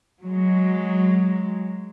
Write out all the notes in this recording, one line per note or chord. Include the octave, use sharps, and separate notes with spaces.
F#3 G#3